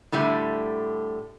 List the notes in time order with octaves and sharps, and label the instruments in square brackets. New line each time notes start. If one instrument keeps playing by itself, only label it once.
[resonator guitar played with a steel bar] A2 D3 G3 A3